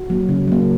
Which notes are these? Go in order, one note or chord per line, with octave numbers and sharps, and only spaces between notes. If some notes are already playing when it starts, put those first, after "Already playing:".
Already playing: F#4
F#3 A#3
C#3
F#3 A#3